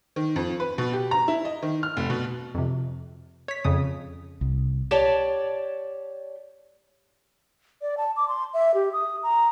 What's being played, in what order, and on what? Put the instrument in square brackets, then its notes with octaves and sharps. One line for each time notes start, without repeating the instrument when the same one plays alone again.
[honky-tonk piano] D#3
F2
B4
B2
G4
A#5
E4
D#5
D#3
F6
F1
B2
[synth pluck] F2 C3
C#5 B6
F2 C#3 D#6
[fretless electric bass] C2
[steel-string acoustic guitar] G4 C#5 D5 A5
[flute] D5
A5
D6
C6
E5
G4
D#6
A#5